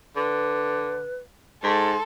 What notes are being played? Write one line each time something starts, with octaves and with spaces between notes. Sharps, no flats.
D3 B4
G#2 A4 C6